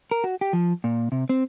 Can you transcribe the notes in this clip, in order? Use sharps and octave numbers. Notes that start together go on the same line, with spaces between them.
A#4
F#4
G4
F3
A#2
C3
C4